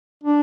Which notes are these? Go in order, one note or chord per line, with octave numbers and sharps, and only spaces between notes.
D4